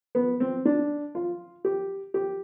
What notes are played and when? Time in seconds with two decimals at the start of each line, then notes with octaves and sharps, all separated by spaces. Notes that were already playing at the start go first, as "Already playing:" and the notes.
0.15 B3
0.40 C4
0.65 D4
1.15 F4
1.65 G4
2.14 G4